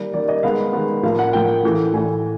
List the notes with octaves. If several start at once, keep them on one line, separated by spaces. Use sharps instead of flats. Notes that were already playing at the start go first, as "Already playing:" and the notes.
Already playing: D#3 G3 A#3
D#3 G3 A#3 D5
D#5
D#3 G#3 B3 F5
D#3 G#3 B3
A2 F3 A#3 F5
F#5
A2 F3 A#3 G5
A2 E3 A3
A2 E3 A3 G#5